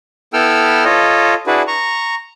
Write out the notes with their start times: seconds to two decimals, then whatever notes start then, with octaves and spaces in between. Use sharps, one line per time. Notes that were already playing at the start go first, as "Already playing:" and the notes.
0.34 B3 E4 A4 G5 E6 F6
0.85 F4 A4 C#5 D#5
1.47 D4 E4 F#4 G#4 B4
1.67 A#5 C#6